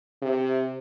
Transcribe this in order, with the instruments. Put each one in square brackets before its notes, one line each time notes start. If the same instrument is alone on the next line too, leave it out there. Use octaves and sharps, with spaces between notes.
[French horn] C3